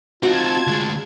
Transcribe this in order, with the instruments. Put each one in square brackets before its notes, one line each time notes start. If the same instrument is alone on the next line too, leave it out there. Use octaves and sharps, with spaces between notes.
[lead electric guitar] C4 D#4 [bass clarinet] F4 [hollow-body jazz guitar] F#4 [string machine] A5 G#6
[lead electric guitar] D2 G#3